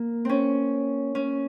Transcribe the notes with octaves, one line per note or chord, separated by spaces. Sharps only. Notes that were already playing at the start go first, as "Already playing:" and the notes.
Already playing: A#3
C4 C#4
C#4